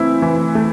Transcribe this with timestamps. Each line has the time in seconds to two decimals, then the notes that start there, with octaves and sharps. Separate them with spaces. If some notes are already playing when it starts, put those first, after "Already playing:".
Already playing: E3 A3 C4 E4
0.22 E3
0.55 A3